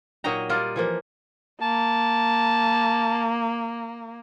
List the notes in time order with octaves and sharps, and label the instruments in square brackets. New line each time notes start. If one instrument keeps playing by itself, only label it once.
[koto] A#2 F#3 D#4 D#5 G5 A#5
G3 A#3 F4 A#4 D5 D#5
E3 F3 A#3
[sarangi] A#3 [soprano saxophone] A5